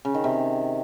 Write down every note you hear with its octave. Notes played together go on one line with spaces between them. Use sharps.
C#3
D#3
C3